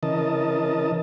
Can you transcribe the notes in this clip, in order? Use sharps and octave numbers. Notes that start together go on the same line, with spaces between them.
C#3 E3 A#4 D#5 A5